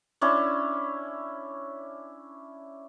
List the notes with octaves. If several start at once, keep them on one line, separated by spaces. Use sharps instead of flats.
C#4 D4 E4